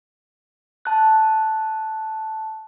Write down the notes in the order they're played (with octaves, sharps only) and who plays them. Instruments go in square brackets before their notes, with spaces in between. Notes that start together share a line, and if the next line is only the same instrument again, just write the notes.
[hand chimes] A5 F#6